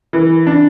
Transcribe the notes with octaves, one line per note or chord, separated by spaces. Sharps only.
E3
D4